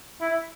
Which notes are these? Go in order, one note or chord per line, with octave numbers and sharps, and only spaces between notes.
E4